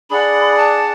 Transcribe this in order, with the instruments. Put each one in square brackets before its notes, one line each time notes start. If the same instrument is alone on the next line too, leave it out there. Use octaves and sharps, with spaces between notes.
[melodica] D4 G#4 D5 F#5 [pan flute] B5
[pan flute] A5